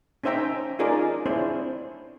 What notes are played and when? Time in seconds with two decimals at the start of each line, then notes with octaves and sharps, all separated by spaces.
0.24 C#4 D#4 C5 E5 G5 A#5
0.79 C#4 D#4 F4 G#4 A#4 D5
1.26 C4 D4 E4 G#4 C5 C#5